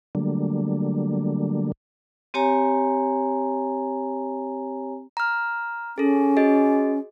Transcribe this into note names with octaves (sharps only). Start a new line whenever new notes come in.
D3 F#3 G3 A3 A#3 D4
C4 G4 C#5 G#5 A#5
A#5 F6
C#4 G#4 A4
F#4 G#4 D#5